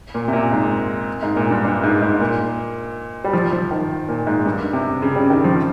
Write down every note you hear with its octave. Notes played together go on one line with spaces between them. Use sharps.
A#2
C3
A#2
G#2
G#2
A#2
G2
G2
G#2
G#2
A#2
G3
F3
F3
D#3
A#2
G#2
G2
C3
C#3
G3
D#3
F3